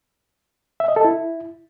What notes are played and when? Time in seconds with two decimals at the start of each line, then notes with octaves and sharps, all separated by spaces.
0.80 E5
0.88 D#5
0.96 A4
1.05 E4